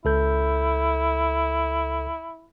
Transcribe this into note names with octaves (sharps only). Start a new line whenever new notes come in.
C#2 E4 A4 G6